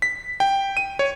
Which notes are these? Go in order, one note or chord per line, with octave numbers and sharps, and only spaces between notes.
B6
G5
D#7
C#5